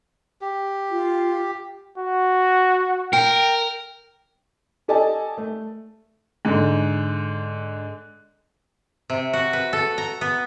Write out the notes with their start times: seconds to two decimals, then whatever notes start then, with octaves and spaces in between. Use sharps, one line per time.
0.41 G4
0.91 F4
1.98 F#4
3.13 A#4 G5
4.88 G4 A4 D5 D#5 G#5 A5
5.38 A3
6.45 G#2 D3
9.10 C3
9.33 F#4
9.53 B4
9.73 A4
9.98 A#5
10.21 B3